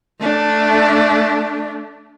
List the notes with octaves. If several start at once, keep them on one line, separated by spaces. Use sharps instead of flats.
A3 D4